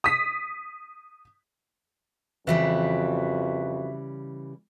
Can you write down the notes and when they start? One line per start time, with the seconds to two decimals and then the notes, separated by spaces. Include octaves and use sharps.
0.04 D#6 B6
2.47 F2 C#3 E3 G3 F#4 B4 E5 B6